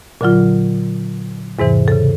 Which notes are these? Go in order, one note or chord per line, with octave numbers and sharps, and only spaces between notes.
A#2 D3 F#3 F4
E2 G#2 C3 E3
C#3 A4